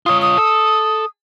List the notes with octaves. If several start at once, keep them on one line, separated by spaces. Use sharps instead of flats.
F4 C#5 D#6
D#6
A4